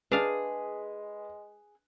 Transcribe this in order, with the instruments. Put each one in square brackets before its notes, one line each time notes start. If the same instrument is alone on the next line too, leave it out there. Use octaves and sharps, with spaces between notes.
[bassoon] G#3 [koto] D4 F5 [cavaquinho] G#4 [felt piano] B4